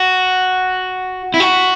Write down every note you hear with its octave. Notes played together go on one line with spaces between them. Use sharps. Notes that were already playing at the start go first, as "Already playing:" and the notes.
Already playing: F#4
E4
F#4